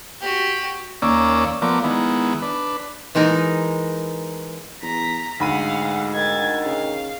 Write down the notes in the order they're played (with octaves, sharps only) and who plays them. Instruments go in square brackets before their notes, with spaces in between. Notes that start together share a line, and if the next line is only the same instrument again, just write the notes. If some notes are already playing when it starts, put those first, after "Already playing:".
[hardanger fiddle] F#4 G4
[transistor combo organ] D#2 A#3 C#4 D5 E6
F3 A3 B3 A#4 D5
D#3 G#3 B3 E4
D4 B4
[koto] E3 G#3 D#4 A#4
[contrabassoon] E2 [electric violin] A#5 B6
[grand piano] D2 B5 D#7 [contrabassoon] G#2 [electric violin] F5 F#5
[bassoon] D#3 [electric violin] G#6 A6
[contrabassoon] C#3 [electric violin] F5